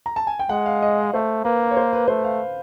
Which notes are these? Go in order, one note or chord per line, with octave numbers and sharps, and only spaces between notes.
A#5
A5
G#5
G5
G#3 F#5
F5
D#5
A3 C5
A#3 B4
C#5
C5
B4
A3 C5
F5